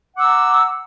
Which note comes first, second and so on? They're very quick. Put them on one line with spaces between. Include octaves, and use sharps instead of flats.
F#5 D6 E6 A#5